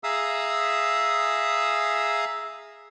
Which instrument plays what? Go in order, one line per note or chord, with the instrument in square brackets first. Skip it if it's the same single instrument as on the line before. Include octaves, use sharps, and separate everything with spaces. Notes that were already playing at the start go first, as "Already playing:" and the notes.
[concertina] G#4 E5 F5 A#5 D#6 E6